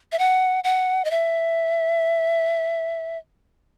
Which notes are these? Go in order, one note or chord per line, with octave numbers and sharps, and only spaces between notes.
E5
F#5
F#5
D#5
E5